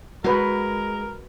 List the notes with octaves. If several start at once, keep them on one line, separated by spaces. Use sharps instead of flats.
G#3 F#4 A#4 B4 F#5